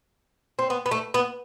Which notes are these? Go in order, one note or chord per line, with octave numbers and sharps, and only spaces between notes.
C4
B3
B3
A3
B3